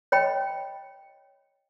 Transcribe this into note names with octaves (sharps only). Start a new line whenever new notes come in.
C#5 D#5 G5 B5